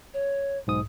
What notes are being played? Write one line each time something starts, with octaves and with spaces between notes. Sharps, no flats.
C#5
B1 G#2 D#6